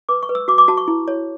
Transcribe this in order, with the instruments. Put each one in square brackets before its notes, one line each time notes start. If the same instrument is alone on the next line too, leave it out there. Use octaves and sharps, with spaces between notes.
[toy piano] B4 D6
C#6
B4
E6
F#4 D6
D6
F#4 A5
C#6
E4
C#5